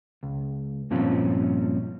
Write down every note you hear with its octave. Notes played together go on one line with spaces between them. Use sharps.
C#2
G2 A#2 F3 C4 C#4